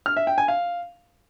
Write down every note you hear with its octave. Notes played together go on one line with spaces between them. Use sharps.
F6
E5
G5
G#5
F5